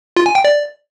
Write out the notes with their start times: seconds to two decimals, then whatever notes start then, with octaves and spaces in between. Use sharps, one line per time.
0.17 F4
0.26 G#5
0.35 G5
0.44 D5